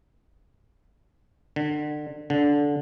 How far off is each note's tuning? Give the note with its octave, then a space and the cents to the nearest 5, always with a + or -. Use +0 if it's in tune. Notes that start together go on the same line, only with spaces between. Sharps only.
D3 +30
D3 -15